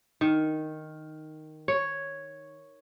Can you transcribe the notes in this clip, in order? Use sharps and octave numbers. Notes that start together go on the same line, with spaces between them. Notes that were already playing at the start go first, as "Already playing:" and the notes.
D#3
C#5